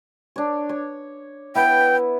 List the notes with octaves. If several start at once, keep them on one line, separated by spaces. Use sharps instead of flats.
D4 C#5
C#5
B3 E4 G5